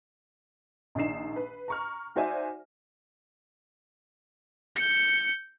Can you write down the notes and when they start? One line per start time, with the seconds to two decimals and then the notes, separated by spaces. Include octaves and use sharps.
0.95 A#1 D#3 D4 D#4 C7 E7
1.36 B4
1.68 A#5 C#6 F6
2.16 D#4 F#4 C5 D5 E5 G#5
4.76 G6 C#7